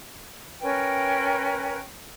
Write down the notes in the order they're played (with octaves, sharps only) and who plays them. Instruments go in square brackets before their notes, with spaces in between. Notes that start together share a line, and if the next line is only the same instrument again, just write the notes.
[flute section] C#4 A#4 B4 G5